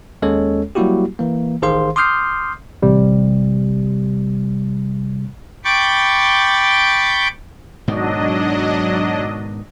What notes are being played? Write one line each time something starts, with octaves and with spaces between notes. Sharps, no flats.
D#2 G#3 C#4 A4 C#5
F#3 G3 A#3 E4 F#4 G4
E3 A#3
A1 D#3 G#4 C5 F5 C6
C6 D6 D#6 F6 G6 C7
A1 C3 G3
G5 B5 C#6 D6 G6 A6
G#2 B2 D#3 F#3 D4 D#5